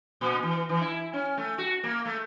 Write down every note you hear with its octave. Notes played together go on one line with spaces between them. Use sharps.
A#2
E3
E3
E4
C#4
A3
F#4
A#3
A3